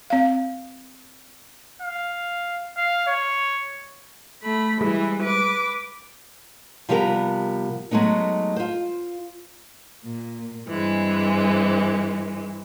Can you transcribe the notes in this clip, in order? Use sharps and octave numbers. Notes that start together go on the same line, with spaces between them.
C4 F5
F5
F5
C#5
A3 B5
E3 G3 G#3 E4
B4 D6
C3 F3 G3 B3 G4 A#4
F#3 G#3 A3 B3 D#4
F4 C5
A#2
G2 E3 G#3 C4